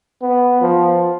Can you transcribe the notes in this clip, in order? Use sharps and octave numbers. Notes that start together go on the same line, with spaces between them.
B3
F3